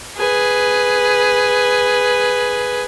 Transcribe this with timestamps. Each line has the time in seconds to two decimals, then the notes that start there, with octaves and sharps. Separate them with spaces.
0.17 G#4 B4